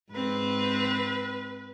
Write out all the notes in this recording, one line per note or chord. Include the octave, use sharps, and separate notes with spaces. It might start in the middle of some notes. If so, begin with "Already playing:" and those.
G#2 C4 B4